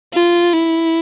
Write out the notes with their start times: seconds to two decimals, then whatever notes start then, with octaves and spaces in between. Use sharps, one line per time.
0.13 F4
0.53 E4